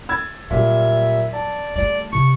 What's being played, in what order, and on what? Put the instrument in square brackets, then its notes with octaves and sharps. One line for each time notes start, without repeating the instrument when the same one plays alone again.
[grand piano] E6 G#6 A6
[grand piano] A#2 G3 [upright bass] F#3 [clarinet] E5
[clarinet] D5 [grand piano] A5
[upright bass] G3 A3 [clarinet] D5
[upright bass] C3 [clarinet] C#6